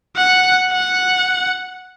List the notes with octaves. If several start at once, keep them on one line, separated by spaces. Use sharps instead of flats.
F#5
F#5